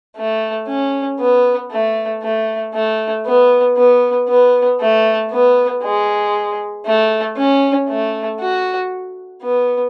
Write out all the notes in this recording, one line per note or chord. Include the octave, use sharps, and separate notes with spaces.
A3
C#4
B3
A3
A3
A3
B3
B3
B3
A3
B3
G#3
A3
C#4
A3
F#4
B3